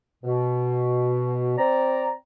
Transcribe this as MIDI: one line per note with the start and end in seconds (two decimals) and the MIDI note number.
0.24 1.56 47
1.58 2.12 60
1.58 2.12 74
1.58 2.12 82